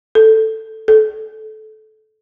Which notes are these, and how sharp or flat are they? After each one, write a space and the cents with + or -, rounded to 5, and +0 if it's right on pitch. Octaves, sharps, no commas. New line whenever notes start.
A4 +5
A4 -20